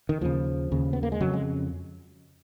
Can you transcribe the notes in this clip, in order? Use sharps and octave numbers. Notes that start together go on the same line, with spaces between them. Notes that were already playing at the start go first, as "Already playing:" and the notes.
D#3
D#2 C#3 F3
D#2 C#3
B3
A#3
G#3
F2 C#3 F#3
G#3